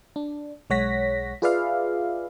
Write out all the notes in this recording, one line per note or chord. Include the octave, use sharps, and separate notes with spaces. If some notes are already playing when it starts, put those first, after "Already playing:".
D4
B1 G#3 C#5 F#5 A#6 B6
F4 G#4 B4 D5 E5 F5